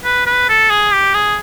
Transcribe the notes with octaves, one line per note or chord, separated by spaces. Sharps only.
B4
B4
A4
G#4
G4
G#4